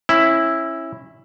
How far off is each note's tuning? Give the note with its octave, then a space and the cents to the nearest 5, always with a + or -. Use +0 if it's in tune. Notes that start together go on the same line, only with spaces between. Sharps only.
C#4 -30 E4 +0